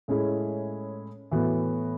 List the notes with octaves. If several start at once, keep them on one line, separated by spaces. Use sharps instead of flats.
A2 G#3 C#4 E4 G#4
A2 E3 B3 F#4